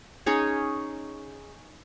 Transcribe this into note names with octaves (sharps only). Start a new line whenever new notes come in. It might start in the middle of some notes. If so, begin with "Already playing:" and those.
C#4 D#4 G#4 C#5